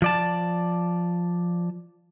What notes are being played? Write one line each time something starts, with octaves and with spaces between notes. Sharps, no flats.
F3 D5 A5